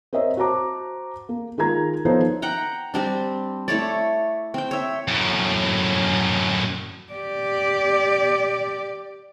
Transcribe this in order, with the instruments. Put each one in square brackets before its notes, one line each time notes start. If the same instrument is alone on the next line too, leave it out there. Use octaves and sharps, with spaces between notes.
[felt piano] C4 A#4 C#5 D#5 E5
F#4 C5 A5 A#5 D6
A#3
D#3 G#3 F4 A#4 A#5 G#6
F3 B3 D#4 A4 C5 C#5
[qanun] F#5 G5 A#5
G3 C4 D4
A3 E4 C#5 D5
C4 G5
C#5 E5
[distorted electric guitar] F#2 A2
[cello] G4 D5